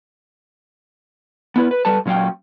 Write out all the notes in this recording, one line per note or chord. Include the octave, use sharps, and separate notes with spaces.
B3 E4 B4
B4
G3 A4 B4 A5
A#2 F#3 C#4 F5 G5